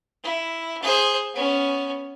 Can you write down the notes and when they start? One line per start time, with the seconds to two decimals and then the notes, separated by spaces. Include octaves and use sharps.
0.24 E4
0.82 G#4 C5
1.34 B3 C#4